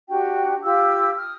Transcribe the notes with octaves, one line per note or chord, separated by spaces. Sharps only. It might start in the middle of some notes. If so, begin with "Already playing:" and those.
D4 F#4 G4 G5
F4 G4 F5 E6
D#6 F6